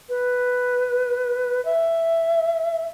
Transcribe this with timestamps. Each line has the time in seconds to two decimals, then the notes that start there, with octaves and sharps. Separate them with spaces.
0.09 B4
1.65 E5